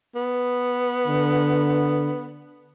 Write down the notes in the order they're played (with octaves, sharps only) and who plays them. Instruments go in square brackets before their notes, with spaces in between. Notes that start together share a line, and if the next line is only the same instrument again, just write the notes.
[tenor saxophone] B3
[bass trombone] D3